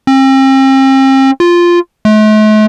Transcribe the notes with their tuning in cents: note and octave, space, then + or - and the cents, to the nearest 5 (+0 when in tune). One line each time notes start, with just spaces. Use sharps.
C4 +40
F4 -5
A3 -45